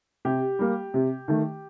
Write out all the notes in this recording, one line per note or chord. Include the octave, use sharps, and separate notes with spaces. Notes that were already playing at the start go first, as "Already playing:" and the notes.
C3 G4
G3 A#3
C3
D#3 A3